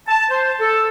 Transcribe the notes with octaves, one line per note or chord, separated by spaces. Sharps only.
A5
C5
A4